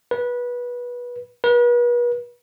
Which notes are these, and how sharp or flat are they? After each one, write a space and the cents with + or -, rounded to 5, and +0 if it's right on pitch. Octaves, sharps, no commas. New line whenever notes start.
B4 -20
B4 -40